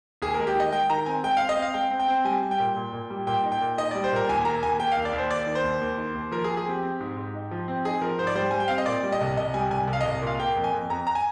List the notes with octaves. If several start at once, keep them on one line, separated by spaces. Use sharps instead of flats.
D#2 G#4
G#3 A#4
G4
D#3 D#5
G#3 G5
D#3 A#5
C4 G#5
G#3 G5
C4 F5
D#5
C4
F5
G#3 G5
C4
G5
C4
G3 G#5
G3
G5
A#2
A#2
A#2
G3
A#2 G5
D#4
G5
A#2
D#4 D#5
G3 D5
C5
A#2 A#4
D#2 G#5
A#3 A#5
D#2 G#5
A#3 G5
F5
D#2
D5
D#2
C5
D#2 D5
D#3
C5
D#2
D#2
D#3
D#2
F3 A#4
G#4
F3
G#4
C4 G4
C4
G#2
G#2
D#4
F3
C4
D#4 G#4
F3 A#4
G#2 C5
D5
G3 C5
G3 G#5
G5
C4 F5
D#5
A#2 D5
G3
D#5
C2
C2 D#5
G3 G#5
C2 G#5
C2
F5
C2 D#5
A#2
F5
A#3 G5
F2
G#5
F2
F2 A#5
A#5
G#5